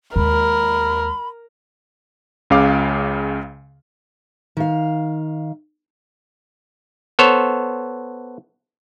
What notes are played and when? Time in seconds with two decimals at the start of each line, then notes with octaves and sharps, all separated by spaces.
0.16 D#2 G#3 A#4 B5
2.50 C#2 C#3 F5 D6
4.57 D#3 F5
7.19 B3 A4 C5 C#5